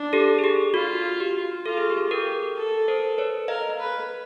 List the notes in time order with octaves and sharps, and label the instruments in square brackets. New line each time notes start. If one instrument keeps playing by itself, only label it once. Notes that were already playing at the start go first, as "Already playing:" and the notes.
Already playing: [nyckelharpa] D4
[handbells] G4 A4
G#4
G4
[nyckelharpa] F4 [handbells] F#4
[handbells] G4
[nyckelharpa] F4 [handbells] A4
[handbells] G#4
G4 A4
[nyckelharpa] G4 [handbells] G#4 A#4
[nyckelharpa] A4
[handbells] A#4 C5
B4 C#5
[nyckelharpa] A#4 [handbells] D#5 F5
[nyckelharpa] B4